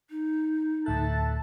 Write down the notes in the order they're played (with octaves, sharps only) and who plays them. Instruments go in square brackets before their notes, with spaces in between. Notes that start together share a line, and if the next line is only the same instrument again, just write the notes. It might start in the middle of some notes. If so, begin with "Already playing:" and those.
[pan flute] D#4
[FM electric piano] D2 A2 F#6 [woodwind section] A4 E5 A5